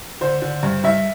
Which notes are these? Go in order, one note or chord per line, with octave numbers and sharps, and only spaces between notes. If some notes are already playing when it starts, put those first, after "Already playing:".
D3 C5
D3
G2
G2 E5